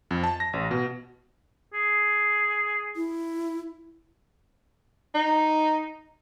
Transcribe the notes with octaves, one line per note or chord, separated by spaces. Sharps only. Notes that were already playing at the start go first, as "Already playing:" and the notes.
F2
A5
A#6
A1
B2
G#4
E4
D#4